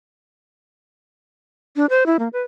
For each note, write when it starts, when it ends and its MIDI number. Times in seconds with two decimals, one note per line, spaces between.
1.76 1.86 62
1.90 2.06 72
2.06 2.17 64
2.19 2.28 58
2.33 2.42 71